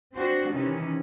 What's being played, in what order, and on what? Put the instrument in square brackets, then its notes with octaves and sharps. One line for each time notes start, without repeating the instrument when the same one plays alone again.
[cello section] C4 D4 F#4 C5
C3 D#3 E3 C#4